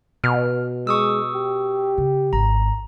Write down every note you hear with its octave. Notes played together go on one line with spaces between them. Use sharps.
B2 F6
G#3 C#6 D#6 E6
G4
C#3
G#1 A#5